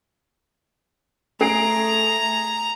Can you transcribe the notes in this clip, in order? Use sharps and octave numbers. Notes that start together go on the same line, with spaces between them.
A3 G#4 A#5 C7 D7